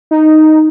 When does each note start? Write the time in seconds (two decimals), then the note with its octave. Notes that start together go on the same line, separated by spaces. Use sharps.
0.11 D#4